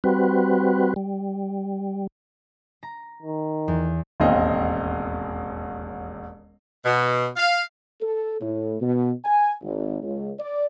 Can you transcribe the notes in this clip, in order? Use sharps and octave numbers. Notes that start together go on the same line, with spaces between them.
G3 C4 F#4 B4
G3
A#5
D#3
E2
E1 A1 D#2 C4 D#5 F5
B2
F5
A4
A2
B2
G#5
G#1
C#2
D5